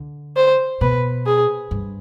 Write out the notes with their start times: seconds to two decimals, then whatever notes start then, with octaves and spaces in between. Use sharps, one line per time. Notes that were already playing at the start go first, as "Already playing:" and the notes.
Already playing: D3
0.36 C5
0.81 B2 B4
1.26 G#4
1.71 G2